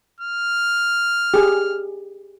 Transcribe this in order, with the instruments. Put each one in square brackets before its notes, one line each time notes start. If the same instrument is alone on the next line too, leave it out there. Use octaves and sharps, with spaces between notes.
[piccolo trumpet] F6
[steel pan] G4 G#4